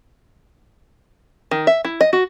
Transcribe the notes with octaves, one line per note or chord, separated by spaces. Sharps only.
D#3
E5
E4
D#5
F#4